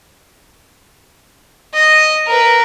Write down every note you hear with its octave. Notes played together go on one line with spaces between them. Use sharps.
D#5
A#4 B4